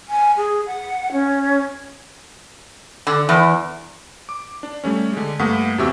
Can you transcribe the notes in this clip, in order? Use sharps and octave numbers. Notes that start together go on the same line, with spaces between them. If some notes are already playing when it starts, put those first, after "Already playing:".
G#5
G#4
F#5
C#4
D3
E2
D6
D4
G3 A3 C#4
D3 G#3
G2 A3 A#3 F#5 D#6 B6
E2 C3 F#4 G4 E5 E6